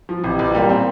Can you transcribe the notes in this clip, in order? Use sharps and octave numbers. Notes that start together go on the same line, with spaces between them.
F3
A1 C3
A1
A#2 G3
C4